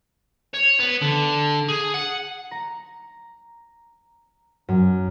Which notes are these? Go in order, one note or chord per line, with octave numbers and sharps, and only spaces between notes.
C#5
B3
D3
G#4
F#5
A#5
F#2